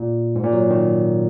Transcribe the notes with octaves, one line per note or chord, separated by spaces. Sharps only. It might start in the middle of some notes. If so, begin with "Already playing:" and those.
Already playing: A#2
G#2
A#2
F#3
D#3